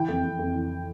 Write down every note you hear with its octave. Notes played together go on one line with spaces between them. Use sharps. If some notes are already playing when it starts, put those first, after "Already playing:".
Already playing: E3 G5
F2
F2
F2
E3